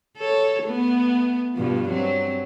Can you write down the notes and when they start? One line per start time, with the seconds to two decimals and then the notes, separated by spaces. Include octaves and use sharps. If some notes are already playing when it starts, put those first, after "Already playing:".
0.17 A4 C#5
0.64 A3 B3
1.55 G2 B2 F3
1.89 F#3 C4